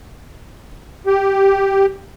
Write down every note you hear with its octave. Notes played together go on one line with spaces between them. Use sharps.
G4